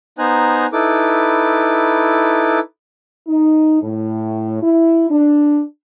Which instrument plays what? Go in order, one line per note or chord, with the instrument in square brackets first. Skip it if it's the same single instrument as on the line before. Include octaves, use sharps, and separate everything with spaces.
[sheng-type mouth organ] B3 D#4 C5 G#5 A#5 F#6
D#4 E4 A4 B4 D6
[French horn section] D#4
A2
E4
D4